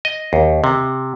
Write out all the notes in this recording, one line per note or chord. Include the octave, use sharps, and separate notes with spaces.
D#5
D#2
C3